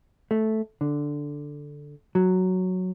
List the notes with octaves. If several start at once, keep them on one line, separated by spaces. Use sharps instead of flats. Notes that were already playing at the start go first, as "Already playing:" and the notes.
A3
D3
F#3